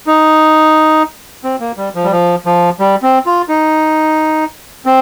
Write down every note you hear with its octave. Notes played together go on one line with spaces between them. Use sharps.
D#4
C4
A#3
G3
F3
G3
F3
F3
G3
C4
F4
D#4
C4